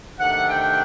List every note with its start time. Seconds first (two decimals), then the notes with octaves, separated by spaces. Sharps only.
0.18 C3 D#3 A3 D4 F#5
0.48 G5